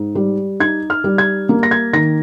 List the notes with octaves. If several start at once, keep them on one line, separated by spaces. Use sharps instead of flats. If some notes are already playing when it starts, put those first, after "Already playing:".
Already playing: G#2
G3
D#4 G#6
F6
G3
G#6
A#3
A#6
G#6
D#3 A#6